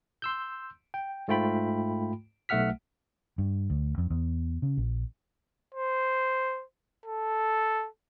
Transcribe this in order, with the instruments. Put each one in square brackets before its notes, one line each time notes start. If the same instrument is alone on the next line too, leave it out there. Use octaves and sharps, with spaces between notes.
[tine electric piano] C6 E6 G6
G5
G#2 A3 F4 G5 B5
B1 A3 E5 F#5 F6 B6
[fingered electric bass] G2
D2
F2
E2
C#3
A#1
[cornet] C5
A4